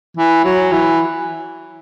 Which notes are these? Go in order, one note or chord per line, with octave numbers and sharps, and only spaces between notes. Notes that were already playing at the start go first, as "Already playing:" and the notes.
E3
F#3
E3